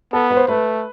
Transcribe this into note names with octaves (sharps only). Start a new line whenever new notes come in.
B3 A4
B4
C5
A3 B4